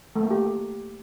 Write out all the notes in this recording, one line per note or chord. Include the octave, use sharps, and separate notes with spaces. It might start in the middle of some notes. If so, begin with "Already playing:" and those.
A3
A#3
G4